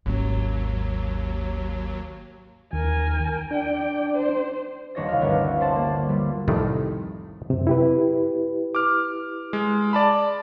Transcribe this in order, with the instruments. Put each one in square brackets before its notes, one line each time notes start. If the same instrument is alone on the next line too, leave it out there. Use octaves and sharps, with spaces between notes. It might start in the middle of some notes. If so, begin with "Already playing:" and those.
[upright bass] G#1 C#4 [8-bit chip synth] D#2 F#3
[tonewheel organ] D#2 [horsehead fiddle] A#4 G#5
[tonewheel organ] D4 [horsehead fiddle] G5
[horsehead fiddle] C5
[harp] D#1 D4 C#5 D#5 A#6
C2 F5
G1 D2 D3 C#4 A#4
C5 D5 A5
A#3
G3
[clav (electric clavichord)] C2 F2 A2 C3 D#3 A3
[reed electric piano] F#2 C3
E4 G4 B4
[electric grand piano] D6 F6
G#3
D5 A5 B5